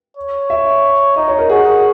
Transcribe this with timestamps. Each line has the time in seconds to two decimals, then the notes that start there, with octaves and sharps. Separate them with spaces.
0.17 C#5
0.50 E5
1.16 D#4 D#5
1.28 C#5
1.38 A#4
1.49 F#4 G#4